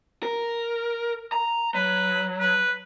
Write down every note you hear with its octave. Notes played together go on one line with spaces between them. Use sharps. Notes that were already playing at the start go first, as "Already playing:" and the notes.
A#4
A#5
F#3 B4
B4